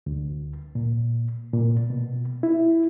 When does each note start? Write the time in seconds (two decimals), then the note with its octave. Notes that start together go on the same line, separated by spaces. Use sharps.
0.06 D2
0.75 A#2
1.53 A#2
1.90 B2
2.43 E4